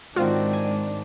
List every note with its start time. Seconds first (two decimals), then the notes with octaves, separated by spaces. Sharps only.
0.16 G#2 D#3 G#3 C4 D4 F4 F#4
0.53 G#5